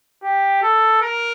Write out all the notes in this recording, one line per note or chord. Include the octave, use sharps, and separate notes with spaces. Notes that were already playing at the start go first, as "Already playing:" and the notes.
G4
A4
A#4